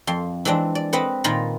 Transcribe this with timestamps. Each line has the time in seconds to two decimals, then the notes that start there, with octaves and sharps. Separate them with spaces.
0.07 F2 C6
0.45 E3 G#3 C4 D4
0.75 D5
0.93 C4 B4 D#5 F#5
1.24 A#2 D#3 F4 F5 A#5 B5